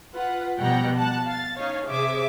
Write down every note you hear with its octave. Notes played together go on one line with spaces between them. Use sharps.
F4 B4 F#5
B2 F3 G3 F#5 G5 A#5
F#5 A5 F#6
F5 A6
C#4 D#4 C#5 F5
C3 G#4 C5 E5 D6